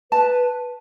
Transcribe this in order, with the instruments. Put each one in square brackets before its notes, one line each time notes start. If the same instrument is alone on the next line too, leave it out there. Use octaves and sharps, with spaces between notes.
[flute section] B4 [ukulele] A5